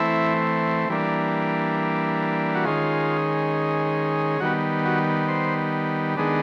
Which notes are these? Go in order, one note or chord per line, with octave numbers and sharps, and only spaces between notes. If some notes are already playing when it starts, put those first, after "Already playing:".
Already playing: E3 A3 C4 E4
E3 G3 A#3 D4
F#4
D#3 G#3 C#4 F4
D#3 G3 B3 F#4
F#4
C5
D#3 G#3 B3 D4